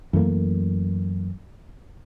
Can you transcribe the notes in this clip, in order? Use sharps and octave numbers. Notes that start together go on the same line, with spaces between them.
F#2 E3 A3 A#3